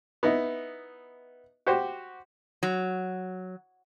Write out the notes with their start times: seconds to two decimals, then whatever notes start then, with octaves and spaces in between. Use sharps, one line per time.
0.23 B3 D#4 E4
1.67 F#4 G4 C5
2.63 F#3